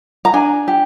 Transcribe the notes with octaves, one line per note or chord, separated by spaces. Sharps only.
A#5
D4 G#5
G4